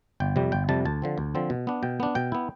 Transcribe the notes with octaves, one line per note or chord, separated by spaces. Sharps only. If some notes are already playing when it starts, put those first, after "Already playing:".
G1 G5
F2 C3 G3
G1 G5
F2 C3 G3 A5
D2 A5
D3 F3 C4
D2
D3 F3 C4
B2
B3 D4
B2 G5
B3 D4
B2 G5
B3 E4